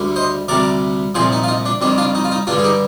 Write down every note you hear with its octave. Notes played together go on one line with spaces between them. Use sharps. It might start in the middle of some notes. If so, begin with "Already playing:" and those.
Already playing: D2 D3 G3
C5 D#5
D2 C3 G3 A#4 D5
C2 A#2 F3 G#4 C5
D#4
F4
D#4
D4
F2 D#3 G3 D4
D4 F4
D#4
F4
D#4
G2 D3 G3 D4 F4
G#4
D#4 G4